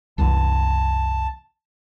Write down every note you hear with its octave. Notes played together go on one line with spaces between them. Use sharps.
C2 F#2 E3 A5